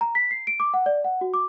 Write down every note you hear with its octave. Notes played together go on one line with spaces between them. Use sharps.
A#5
B6
C7
D7
D6
F#5
D5
F#5
F#4
D6